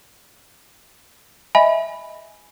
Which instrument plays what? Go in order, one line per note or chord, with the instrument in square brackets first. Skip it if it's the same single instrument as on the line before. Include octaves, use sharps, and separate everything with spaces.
[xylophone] D#5 E5 G#5 B5